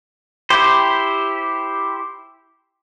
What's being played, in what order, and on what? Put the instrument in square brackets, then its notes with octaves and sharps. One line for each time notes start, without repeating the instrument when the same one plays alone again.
[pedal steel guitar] E4 G4 C5